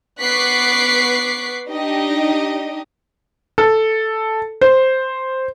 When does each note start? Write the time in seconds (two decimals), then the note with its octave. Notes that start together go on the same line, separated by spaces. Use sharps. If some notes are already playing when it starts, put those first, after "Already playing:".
0.21 B3 C#6 D6 F#6 B6 C7
1.69 D4 D#4 G4 D#5
3.58 A4
4.61 C5